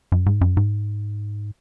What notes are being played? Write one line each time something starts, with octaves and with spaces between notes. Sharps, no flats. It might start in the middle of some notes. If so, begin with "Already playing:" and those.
F#2
G#2
F#2
G#2